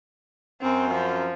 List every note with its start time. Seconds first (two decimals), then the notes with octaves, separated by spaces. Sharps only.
0.61 F#2 C4
0.91 F3